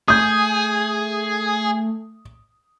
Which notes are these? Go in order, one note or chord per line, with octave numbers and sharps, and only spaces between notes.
A3 G#4 D#6 G6